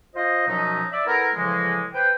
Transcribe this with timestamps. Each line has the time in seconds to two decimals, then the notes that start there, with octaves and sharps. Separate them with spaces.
0.15 F4 C5 D#5
0.47 F#2 B2 F3 F#3 C#4 D#4
0.92 D5 E5
1.06 B3 E4 A4 A#4
1.35 A2 C#3 E3 F3 G#3
1.94 B4 C5 G5